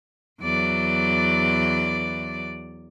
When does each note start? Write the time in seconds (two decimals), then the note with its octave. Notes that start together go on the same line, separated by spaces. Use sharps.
0.41 E2 F#3 D5